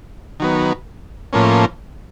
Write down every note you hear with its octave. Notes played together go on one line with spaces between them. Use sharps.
D#3 F#3 B3
A2 F3 A#3 C#4